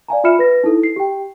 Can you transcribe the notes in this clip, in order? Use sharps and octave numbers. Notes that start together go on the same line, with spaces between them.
D5 F5 G#5 A#5
F4 E5 B5 F6 C#7 E7
B4 A#6
D#4 E4 A4
C7
G4 G5